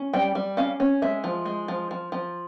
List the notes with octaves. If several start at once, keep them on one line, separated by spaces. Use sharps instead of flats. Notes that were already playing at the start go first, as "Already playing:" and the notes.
Already playing: C#4
G3 G5
G3
C#4 F5
C#4
G#3 E5
F3
G#3
F3
F3
F3